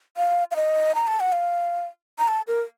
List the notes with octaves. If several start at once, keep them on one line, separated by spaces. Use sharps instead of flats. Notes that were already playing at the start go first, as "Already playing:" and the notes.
F5
F5
D#5
A#5
A5
F#5
F5
A#5
A5
A#4